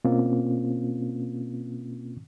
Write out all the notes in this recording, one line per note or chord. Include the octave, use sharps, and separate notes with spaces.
B2 A#3 C4 C#4 F4